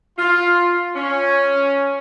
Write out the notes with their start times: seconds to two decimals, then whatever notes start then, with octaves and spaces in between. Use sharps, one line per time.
0.18 F4
0.96 C#4